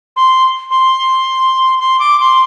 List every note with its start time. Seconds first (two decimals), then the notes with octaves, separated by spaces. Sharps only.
0.16 C6
0.71 C6
1.79 C6
1.99 D6
2.20 C6